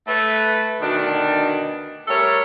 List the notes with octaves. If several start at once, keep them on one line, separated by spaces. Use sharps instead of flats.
A3 B4
D2 B2 D#3 D4
G3 A3 A4 A#4 C#5